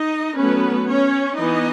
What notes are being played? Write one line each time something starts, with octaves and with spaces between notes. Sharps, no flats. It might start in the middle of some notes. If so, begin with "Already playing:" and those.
Already playing: D#4 D#5
F#3 A3 B3 C#4 B4
C#4 C#5
E3 B3 D#4 D#5